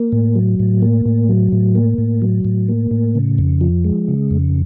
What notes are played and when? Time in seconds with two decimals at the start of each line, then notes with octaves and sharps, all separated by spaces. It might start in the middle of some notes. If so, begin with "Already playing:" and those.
Already playing: A#3
0.12 A2
0.35 F#3
0.59 A2
0.82 A#3
1.06 A2
1.29 F#3
1.52 A2
1.75 A#3
1.98 A2
2.22 F#3
2.45 A2
2.69 A#3
2.91 A2
3.15 C#3
3.38 F2
3.61 F3
3.84 G#3
4.08 C#3
4.31 F2